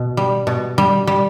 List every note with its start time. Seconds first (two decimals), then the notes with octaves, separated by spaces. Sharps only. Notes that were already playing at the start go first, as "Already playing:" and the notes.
Already playing: B2
0.17 G3
0.47 B2
0.78 G3
1.07 G3